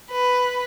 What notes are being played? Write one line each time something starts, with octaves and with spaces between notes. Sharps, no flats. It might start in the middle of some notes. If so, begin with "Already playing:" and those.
B4